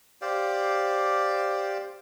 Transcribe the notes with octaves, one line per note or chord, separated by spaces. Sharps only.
G4 C5 D5 F5